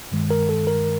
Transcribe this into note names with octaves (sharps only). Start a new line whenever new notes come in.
G2 D#3 G#3
A#4
A4
A#4